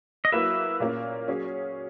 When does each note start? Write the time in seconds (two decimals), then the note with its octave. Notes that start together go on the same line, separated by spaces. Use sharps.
0.25 D#5
0.32 F#3 A#3 E4 B4 E5
0.80 A#2 A#3 C#4
1.28 F#3 C#4 G#4 C#5